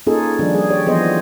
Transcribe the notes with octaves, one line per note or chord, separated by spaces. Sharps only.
A#3 C#4 D#4 F4 G#4 A4
D#3 F3 G3 D4
G3 G#4
G4 C#5 D5
E3 F3 B3 G#4 C5 D#5